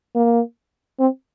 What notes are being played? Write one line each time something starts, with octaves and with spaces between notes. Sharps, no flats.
A#3
C4